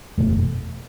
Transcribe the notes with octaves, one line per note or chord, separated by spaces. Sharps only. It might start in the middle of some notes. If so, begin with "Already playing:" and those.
F#1 E2 B2 A3